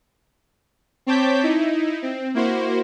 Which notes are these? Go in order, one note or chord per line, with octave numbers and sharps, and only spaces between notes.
C4 C#5 A5 D6 G6 B6
D#4 E4
C4
A#3 E4 F#4 C5